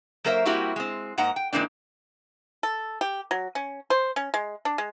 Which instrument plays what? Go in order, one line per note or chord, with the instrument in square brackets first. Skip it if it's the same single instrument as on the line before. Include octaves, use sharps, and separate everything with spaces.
[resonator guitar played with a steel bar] F#3 A#3 A#4 C5 E5
G3 A#3 C4 E4 F#4 G4
G#3 C4
G#2 A#3 F#5 A#5
G5
G#2 E3 A#3 C4 D4
[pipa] A4
G4
F#3
C#4
C5
C#4
G#3
D4
G#3